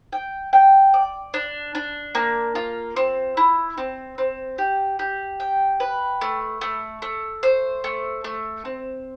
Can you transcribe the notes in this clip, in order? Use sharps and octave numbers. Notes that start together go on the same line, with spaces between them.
G5
G5
D5
D4
D4
A#3
F4
C4
E4
C4
C4
G4
G4
G5
B4
A3
A3
A3
C5
A3
A3
C4